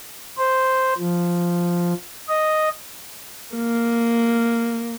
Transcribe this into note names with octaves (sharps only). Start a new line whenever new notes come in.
C5
F3
D#5
A#3